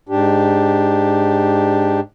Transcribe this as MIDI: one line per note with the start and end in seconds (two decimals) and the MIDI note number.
0.09 2.00 44
0.09 2.00 62
0.09 2.00 67